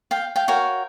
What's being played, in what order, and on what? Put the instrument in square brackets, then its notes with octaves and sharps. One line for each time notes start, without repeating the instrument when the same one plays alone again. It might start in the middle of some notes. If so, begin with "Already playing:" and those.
[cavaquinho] F5 G5
F5 G5
F#4 A#4 C#5 F5 G5